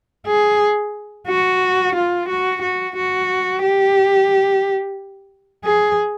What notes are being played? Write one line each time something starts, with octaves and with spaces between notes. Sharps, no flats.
G#4
F#4
F4
F#4
F#4
F#4
G4
G#4